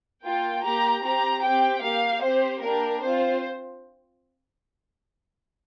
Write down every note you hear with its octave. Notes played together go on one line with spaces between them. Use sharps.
A#3 F4 G5
A#3 G4 A#5
C4 G4 A#5
G4 G5
C4
A#3 G4 F5
C4 G4 C5
A#3 D4 G4 A#4
C4 F4 C5